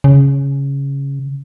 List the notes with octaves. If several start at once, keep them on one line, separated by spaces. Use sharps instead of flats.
C#3